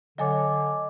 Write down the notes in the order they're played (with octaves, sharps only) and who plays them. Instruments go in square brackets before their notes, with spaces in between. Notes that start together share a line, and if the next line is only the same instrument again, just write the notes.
[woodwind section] D3 [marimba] F#3 A4 C#5 [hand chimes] D#5 G#5 D6